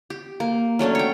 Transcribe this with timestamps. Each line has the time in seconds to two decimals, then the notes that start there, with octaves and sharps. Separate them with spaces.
0.10 G4
0.40 A#3
0.79 F#3 A3 C#4 D4
0.95 C#5 G5